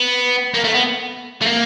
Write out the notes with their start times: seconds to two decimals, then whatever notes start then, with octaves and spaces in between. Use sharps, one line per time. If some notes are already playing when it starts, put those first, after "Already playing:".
Already playing: B3
0.54 A#3
0.64 A3
0.74 B3
1.41 A3
1.46 A#3